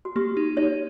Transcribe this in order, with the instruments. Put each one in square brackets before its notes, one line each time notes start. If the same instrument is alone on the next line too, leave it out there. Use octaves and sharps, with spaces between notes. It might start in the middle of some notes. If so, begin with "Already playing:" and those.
[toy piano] F#4
[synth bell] A#3 [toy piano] G4
[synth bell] D#4
[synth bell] D#4 [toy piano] C#5